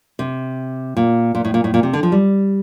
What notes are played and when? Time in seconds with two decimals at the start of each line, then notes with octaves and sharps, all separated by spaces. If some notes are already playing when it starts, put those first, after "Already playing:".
0.19 C3
0.97 A#2
1.35 A#2
1.45 A2
1.54 A#2
1.64 A2
1.74 A#2
1.83 C3
1.93 D3
2.03 F3
2.12 G3